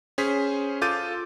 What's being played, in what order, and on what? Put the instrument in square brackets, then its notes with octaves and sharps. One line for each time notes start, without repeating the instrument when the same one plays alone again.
[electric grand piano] C#4 G#4 C5 B6
F4 A4 D6 G6 A6 D#7